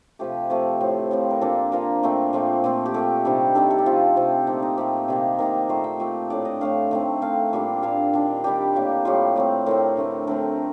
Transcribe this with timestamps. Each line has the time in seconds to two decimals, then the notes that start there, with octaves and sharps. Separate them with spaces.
0.19 C3 F3 A3 G4
0.50 C3 F3 A3
0.81 A2 F3 C4
1.11 A2 F3 C4
1.31 A#4
1.41 A#2 F3 A#3 D4 A4
1.72 A#2 F3 A#3 D4 A#4
2.03 A#2 F3 A3 C4
2.33 A#2 F3 A3 C4
2.64 A#2 A3 C4
2.86 G4
2.94 A#2 A3 C4 A4
3.25 C3 D#3 G3 D4
3.55 C3 D#3 G3 D4 A4
3.70 A4
3.78 G4
3.86 C3 F3 C4 F4
4.16 C3 F3 C4
4.47 A#2 A3 C4 D#4
4.62 D#4
4.77 A#2 A3 C4 G4
5.08 C3 D#3 A#3
5.38 C3 D#3 A#3 A#4
5.69 A#2 A3 C4 C5
5.84 G5
6.00 A#2 A3 C4
6.30 A2 A3 D4 D5
6.45 D#5
6.61 A2 A3 D4 F5
6.91 D#3 A3 C4
7.22 D#3 A3 C4 F5
7.53 A#2 G3 D4
7.83 A#2 G3 D4 F5
8.13 D#3 G3 D4
8.44 D#3 G3 D4 G4
8.75 A2 G3 A#3
9.05 A2 G3 A#3 F4
9.36 A2 A3 C4
9.66 A2 A3 C4 A#4
9.97 D3 A3 C4
10.27 D3 A3 C4 A#4